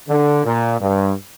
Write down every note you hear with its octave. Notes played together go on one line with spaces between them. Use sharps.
D3
A#2
G2